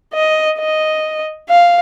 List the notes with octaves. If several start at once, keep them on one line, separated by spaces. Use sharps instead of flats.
D#5
D#5
F5